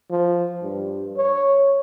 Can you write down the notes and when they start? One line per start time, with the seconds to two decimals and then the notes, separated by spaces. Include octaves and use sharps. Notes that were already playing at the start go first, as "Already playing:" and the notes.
0.11 F3
0.63 G2
1.17 C#5